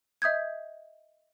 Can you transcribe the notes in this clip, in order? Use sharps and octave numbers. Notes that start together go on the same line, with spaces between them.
D#5 E5 D#6 G6 G#6